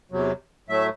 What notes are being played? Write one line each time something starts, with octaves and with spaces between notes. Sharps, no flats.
E2 C3 F#3
A2 F#3 A3 E5